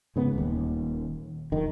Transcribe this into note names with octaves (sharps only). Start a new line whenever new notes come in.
G#2 C#3 B3
D#1 D#2
F1 D#3